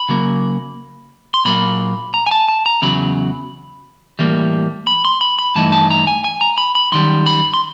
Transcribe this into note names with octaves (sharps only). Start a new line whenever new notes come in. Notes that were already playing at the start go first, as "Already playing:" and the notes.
Already playing: B5
C#3 F#3 A#3
C6
A#2 F#3 A#3 B5
A#5
G#5
A5
A5
A#5
E2 C#3 F#3 B5
A2 E3 G3 A#3
B5
C6
B5
B5
G2 E3 A3 D#4 A5
A5
A#5
G#5
G#5
A#5
B5
B5
F#2 D#3 G3 C6
B5
C6